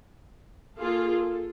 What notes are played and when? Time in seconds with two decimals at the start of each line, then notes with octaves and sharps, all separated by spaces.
0.78 A#3 F4 G#4 A4
1.10 A4